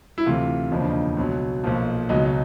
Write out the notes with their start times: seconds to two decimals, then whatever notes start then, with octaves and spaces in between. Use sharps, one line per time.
0.18 E4
0.26 D2 C3 E3 F4
0.71 E1 D#2 C#3 F3 D#4
0.80 D4
0.90 D#4
1.17 C#2 B2 F#3
1.64 B1 A#2 F3
2.09 C#2 B2 F#3 D#4
2.26 D#4